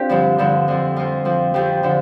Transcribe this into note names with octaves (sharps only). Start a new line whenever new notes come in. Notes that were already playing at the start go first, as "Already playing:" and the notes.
Already playing: C4 D4 F4 G4
G2 D3 F3
G2 D3 F3
F2 F3
F2 F3 F4
F2 F3
F2 F3 G4
D3 F3